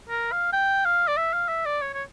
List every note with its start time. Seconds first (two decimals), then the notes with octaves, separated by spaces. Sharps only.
0.09 A#4
0.32 F5
0.53 G5
0.85 F5
1.08 D5
1.17 E5
1.33 F5
1.48 E5
1.66 D5
1.81 C#5
1.94 C#5